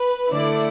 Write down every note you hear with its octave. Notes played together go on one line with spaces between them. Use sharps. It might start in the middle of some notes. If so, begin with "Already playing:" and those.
Already playing: B4
D3 A3 E4 D5